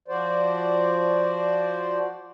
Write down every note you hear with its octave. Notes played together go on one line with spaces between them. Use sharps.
F3 F#4 C5 D5